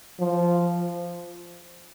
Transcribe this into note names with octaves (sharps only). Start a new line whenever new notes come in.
F3